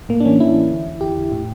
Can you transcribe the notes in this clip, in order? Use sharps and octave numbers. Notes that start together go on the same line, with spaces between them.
A2 A#3
D4
E3 C#4
E3 E4
E3
D3
E2
E2 G4
D3
A2